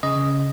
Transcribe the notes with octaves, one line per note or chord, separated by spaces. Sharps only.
C#3 D#5